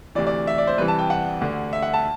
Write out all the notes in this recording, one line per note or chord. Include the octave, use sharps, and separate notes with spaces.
D2 C3 E3 D5
D5
E5
D5
C5
C2 C3 E3 B4
A5
G5
F#5
D2 D3
E5
F#5
A5